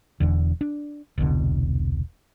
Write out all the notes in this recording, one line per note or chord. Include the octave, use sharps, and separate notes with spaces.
E1 E2 D3
D4
E1 C2 B2 D3